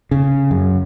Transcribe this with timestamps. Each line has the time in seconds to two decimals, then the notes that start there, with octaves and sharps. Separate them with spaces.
0.11 C#3
0.51 F#2